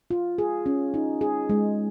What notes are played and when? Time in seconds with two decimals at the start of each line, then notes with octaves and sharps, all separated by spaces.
0.11 F4
0.38 G#4
0.66 C#4
0.94 D#4
1.21 G#4
1.49 G#3